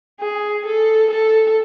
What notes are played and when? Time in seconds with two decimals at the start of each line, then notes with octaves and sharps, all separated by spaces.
0.21 G#4
0.66 A4
1.11 A4